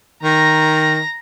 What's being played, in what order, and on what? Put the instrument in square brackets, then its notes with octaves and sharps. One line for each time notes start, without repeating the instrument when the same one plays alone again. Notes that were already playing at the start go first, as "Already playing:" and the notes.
[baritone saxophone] D#3 [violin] A#5 A#6